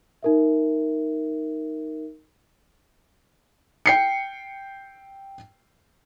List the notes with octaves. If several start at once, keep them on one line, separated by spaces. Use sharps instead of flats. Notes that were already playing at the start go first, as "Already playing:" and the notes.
D#4 A#4 E5
G5 C7 C#7